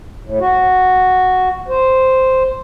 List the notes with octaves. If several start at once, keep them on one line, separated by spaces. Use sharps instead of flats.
A2
F#4
C5